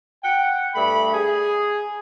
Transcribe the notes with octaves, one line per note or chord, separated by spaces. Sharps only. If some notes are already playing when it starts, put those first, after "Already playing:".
F#5 G5
G2 A3 B5
G#4